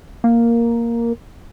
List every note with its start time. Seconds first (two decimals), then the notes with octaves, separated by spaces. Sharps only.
0.24 A#3